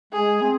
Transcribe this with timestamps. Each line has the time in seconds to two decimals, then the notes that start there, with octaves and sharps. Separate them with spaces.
0.12 G#3 G#4
0.42 C4